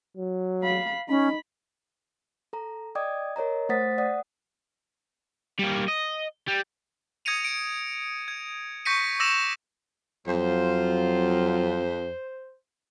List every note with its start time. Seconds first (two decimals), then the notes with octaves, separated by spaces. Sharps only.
0.17 F#3
0.63 F5 B5
1.09 C#4 D#4 B5
2.53 A4 A#5
2.95 D5 D#5 G5 D6 D#6 G#6
3.36 A#4 C#5 D#5 A#5
3.69 A3 C5 F#5 D#6 A6 B6
3.98 D5 F#5 D#6
5.59 G3 A#3
5.88 D#5
6.48 G3
7.25 D#6 G#6 A#6 C#7 D#7 F7
7.45 D7
8.28 G#6
8.85 C#6 G6 A#6 B6 C#7 D#7
9.20 D6 E6 A#6 C#7 E7 F7
10.28 F2 F#3 F4 C5